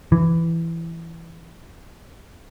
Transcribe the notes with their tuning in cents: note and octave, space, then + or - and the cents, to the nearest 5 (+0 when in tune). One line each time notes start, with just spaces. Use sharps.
E3 +10